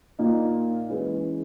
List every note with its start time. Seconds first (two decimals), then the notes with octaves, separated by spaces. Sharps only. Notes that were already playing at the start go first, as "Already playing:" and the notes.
0.19 A#2 A#3 D#4
0.89 E3 G#3 C#4 G#4 B4